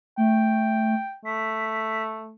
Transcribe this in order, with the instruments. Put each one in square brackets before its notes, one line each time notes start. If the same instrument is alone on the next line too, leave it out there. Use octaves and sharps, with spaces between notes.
[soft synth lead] A3 [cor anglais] G5
[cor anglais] A3 [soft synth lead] B6